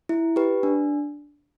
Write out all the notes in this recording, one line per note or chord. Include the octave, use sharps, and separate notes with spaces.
E4
G4 B4
D4